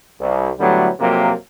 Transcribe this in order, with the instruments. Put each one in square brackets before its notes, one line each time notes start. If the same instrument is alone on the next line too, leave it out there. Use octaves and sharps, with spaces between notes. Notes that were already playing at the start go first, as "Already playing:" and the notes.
[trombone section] C2
A2 D3 F#3 G3 A3 B3
F2 C3 F#3 A#3